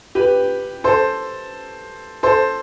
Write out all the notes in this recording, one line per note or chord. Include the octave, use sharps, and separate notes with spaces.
G4 B4
A4 C5
A4 C5